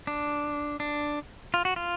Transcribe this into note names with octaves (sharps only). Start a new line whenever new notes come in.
D4
D4
F4
F#4
F4